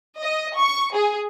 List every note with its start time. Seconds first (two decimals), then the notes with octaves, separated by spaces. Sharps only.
0.20 D#5
0.56 C#6
0.93 G#4